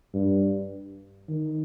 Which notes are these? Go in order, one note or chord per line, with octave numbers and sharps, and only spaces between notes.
G2
D#3